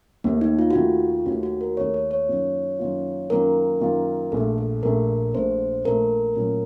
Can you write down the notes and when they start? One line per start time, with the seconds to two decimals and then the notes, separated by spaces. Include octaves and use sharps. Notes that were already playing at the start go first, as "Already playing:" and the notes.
0.24 D#2 D#3 A3 A#3
0.41 D#4
0.59 F4
0.71 F#4
0.75 D#2 D#3 A3 F4
1.26 D#2 D#3 A3 F#4
1.43 F#4
1.61 A#4
1.77 D#2 D#3 A3 C#5
1.94 C#5
2.11 C#5
2.28 F#2 D#3 A#3 F4
2.79 F#2 D#3 A#3 F4
3.30 F#2 D#3 A#3 F4 A#4
3.81 F#2 D#3 A#3 F4
4.32 A#1 A#2 A3 A4
4.58 A4
4.83 A#1 A#2 A3 A#4
5.34 A#1 A#2 A3 C5
5.85 A#1 A#2 A3 A#4
6.36 A#2 F#3 A3 C#4 F4